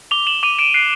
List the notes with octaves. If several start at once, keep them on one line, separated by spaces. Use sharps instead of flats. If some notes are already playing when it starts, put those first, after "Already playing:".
D6 F7 G7
E7 F#7
D6 D#7 F7
D7 E7
F#6 C7 D7